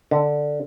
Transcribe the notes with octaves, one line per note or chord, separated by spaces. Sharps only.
D3